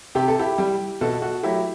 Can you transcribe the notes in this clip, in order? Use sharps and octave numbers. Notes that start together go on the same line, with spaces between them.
C3 G4
A4
E4 G4
G3
B2 F#4 A4
F#4 A4
F#3 A3 E4 G4